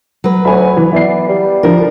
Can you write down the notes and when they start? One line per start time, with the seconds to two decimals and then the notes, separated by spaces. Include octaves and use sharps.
0.24 F#3 B4
0.45 D2 C#5 G#5 B5
0.77 E3 B3
0.93 E3 B3 D5 C7
1.29 G3
1.63 D3 F3 A#4